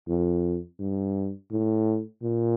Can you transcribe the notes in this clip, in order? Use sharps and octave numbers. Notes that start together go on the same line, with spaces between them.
F2
G2
A2
A#2